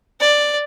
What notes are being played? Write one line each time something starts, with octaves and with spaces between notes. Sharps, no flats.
D5